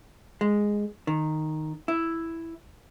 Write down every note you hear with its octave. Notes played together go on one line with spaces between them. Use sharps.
G#3
D#3
E4